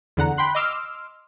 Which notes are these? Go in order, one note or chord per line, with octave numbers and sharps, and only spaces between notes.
E2 D3 F#5 A#5
G5 B5 C6 F#6
D#5 C6 D6 E6 F6